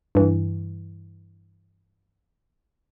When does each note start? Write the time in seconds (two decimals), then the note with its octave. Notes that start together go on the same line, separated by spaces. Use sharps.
0.15 G2 E3